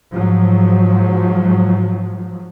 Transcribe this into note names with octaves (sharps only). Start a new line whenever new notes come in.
G#2 F3 F#3